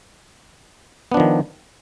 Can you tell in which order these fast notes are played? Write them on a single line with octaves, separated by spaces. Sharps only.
B3 D4 F3 D#3